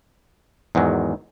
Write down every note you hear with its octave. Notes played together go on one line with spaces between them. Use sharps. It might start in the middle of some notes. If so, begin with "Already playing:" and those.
E2 G#2 D#3 F#3